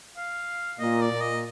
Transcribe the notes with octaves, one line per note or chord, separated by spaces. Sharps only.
F5
A#2 D#5
D5
A#2
D#5